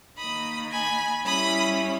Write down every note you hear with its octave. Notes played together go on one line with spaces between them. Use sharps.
D#3 A#3 D#4 B5 D#6
G#5 B5
G3 C#4 E4 B5 D#6